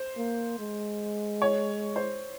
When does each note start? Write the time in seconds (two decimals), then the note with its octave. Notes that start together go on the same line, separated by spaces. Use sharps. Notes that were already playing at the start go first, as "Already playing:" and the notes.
Already playing: C5
0.17 A#3
0.59 G#3
1.42 C#5
1.96 C5